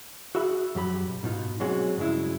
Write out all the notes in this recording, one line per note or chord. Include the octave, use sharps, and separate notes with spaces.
F#4 G#4 E5 B5
F#2 F#3 G4 B5
B1
G#2 B2 D#4 F4
F#3 G#3 C4 C#4 F#4 G#4
G2 C#3 F#3 G#3 E4